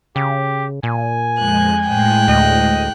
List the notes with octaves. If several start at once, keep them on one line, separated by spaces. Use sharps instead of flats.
C#3 G4
A#2 G#5
F2 G#3 F#6 G6
A2 G#3 G5 F#6
D2 D#5